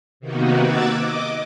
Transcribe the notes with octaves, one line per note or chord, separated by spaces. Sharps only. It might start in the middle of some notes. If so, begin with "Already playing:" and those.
C3 D#3 A#3 B3 D#4 F#4
D6 E6 F#6 G#6 A6
D#5 D6